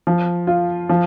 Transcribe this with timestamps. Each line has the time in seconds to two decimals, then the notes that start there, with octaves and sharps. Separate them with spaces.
0.07 F3
0.47 F4
0.89 F3